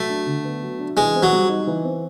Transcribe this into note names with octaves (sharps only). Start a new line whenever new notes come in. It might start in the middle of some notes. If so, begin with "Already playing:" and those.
Already playing: F#3 A3
D4
D3
B3
F#3
D4
E3 G#3
C4
F#3
G3
D#4
E3
C4